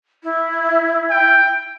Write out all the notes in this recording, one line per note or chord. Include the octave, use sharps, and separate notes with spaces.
E4
G5